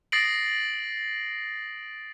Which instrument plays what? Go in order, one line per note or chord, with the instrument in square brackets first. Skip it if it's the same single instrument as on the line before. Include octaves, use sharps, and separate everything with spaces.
[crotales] D#6 A6 A#6 C7 D7 F#7